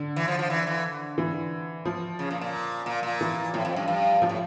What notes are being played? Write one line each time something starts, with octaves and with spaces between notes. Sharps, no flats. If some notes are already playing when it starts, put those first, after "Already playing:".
Already playing: D3
E3
F3
F3
E3
E3
E3
F3
C#3
A#2
A#2
A#2
A#2
E3
A2 F3
F2
G2
G2
A#2 F3
A2